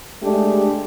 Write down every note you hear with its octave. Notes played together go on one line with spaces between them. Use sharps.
G#3 A3 D4 G4